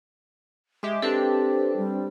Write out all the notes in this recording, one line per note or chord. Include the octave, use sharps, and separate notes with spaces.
G#3 G4 E5
C4 D4 G4 A4 B4
G3